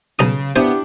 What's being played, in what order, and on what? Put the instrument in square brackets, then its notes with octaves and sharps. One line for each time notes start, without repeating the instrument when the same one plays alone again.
[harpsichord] B1 A#5 D#6 [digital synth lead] C#3
[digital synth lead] B3 [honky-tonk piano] D4 E4 [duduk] G4 [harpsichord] C5 G#5